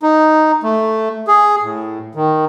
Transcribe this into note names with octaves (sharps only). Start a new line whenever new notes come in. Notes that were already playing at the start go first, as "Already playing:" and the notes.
D#4
A3
G#4
A2
D#3